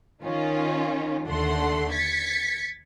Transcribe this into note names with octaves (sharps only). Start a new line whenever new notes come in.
D#3 C#4 F4
D#2 D3 A3 A4 F#5 C6
G#6 A6 B6 C#7